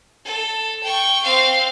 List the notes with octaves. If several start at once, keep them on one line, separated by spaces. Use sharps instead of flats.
A4
G5 C#6
C4 F5